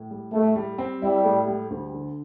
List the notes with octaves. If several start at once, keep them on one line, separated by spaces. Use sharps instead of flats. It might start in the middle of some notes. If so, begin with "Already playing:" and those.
Already playing: A2
G3
A2 A3
G3
C4
G3 E4
A2
G3
D2
D3